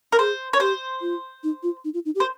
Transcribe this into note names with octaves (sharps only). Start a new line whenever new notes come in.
A#4
G#4 C5
C#5
G4 C5
F4
D#4
F4
D#4
F4
D#4
G4
C5